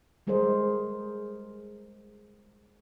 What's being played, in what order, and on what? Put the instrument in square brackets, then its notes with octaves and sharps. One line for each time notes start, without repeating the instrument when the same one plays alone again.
[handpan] G3 G#3 G#4 A#4 C5 D#5